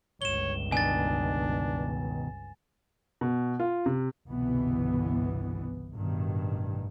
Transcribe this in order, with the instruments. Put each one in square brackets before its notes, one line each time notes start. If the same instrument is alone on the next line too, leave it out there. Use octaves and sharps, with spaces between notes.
[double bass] G1 C#2 [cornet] C#5 [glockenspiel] E7 G7
[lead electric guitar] B2 D#3 [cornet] D4 [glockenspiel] G#5 A6
[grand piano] B2
F4
C3
[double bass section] G1 C2 B2 E3 B3
A1 G2 B2 D#3